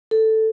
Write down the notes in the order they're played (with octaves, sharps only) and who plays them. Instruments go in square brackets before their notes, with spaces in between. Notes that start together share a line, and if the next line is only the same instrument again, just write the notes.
[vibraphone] A4